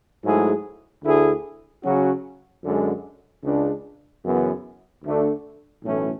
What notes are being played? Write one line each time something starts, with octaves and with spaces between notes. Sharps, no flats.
G#2 F#3 A3 E4 G#4
D2 D3 A3 E4 G#4
C#3 F#3 C#4 F#4
F#2 D3 G#3
C#2 C#3 G#3 D4
F#2 C#3 E3 B3
D2 D3 A3 D4
B1 A2 E3 A3 C#4